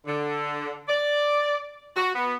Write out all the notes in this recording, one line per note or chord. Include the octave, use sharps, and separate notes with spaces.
D3
D5
F#4
B3